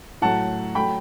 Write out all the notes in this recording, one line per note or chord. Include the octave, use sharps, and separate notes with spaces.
A2 F#3 A3 F#5 A5
F#3 A3 G5 B5